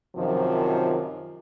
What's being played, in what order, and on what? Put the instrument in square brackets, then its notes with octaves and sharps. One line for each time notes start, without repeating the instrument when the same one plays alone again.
[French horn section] F#2 C3 D#3 F3